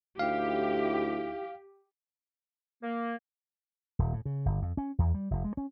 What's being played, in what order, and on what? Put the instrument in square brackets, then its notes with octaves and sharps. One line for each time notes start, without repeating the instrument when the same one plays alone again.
[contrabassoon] D2 [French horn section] D#4 E4 [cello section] G4 [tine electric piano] F5
[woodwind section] A#3
[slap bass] D#1
A2
C#3
G1
F2
C#4
E2
G3
F1
G#3
C#4